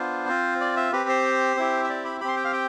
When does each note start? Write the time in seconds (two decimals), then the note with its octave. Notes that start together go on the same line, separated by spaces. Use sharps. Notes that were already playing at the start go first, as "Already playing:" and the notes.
Already playing: B3 D4 F4 C5
0.29 C4 F4
0.61 D5
0.77 E5
0.92 C4 G4 B4
1.09 C5
1.57 C4 E4 G4
1.84 E5
1.89 D5
2.05 B5
2.21 G4 B5
2.24 C4 C6
2.37 G5
2.45 F5
2.53 G5